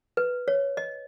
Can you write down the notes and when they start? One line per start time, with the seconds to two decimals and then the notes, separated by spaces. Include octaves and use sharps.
0.17 B4
0.48 C#5
0.77 D#5